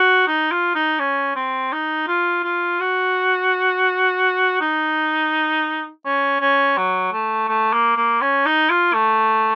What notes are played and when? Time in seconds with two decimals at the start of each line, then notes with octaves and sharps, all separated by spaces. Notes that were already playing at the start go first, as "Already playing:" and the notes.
Already playing: F#4
0.28 D#4
0.52 F4
0.75 D#4
0.99 C#4
1.36 C4
1.72 D#4
2.08 F4
2.44 F4
2.80 F#4
4.61 D#4
6.05 C#4
6.41 C#4
6.77 F#3
7.13 A3
7.49 A3
7.73 A#3
7.97 A#3
8.21 C#4
8.46 D#4
8.70 F4
8.94 A3